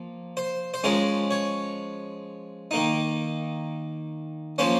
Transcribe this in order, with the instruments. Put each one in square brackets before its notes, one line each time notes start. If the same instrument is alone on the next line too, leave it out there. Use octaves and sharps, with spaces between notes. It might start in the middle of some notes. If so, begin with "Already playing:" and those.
Already playing: [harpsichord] F3 A#3
C5
C5
F3 G#3 C#4 A#4
C#5
D#3 A#3 D#4
F3 A#3 C#4 C5